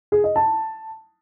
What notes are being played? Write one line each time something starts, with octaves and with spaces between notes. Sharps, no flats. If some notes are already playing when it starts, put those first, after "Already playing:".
G#4
D#5
A5